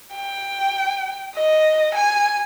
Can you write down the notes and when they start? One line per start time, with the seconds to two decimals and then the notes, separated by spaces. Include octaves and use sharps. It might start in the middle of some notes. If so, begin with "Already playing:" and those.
0.14 G5
1.35 D#5
1.94 G#5